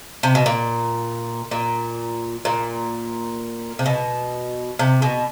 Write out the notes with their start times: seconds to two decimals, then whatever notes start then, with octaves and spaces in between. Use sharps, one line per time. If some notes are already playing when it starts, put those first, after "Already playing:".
0.23 C3
0.35 B2
0.46 A#2
1.51 A#2
2.45 A#2
3.79 C3
3.86 B2
4.79 C3
5.02 B2